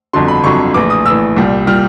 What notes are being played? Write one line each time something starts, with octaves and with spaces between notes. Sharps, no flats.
G1 F2 D3 F#3 C6
B5
G1 F2 D3 F#3 C#6
A#1 A2 E3 D6
D#6
A#1 A2 E3 E6
C2 A#2 G3
A#2 G3 F6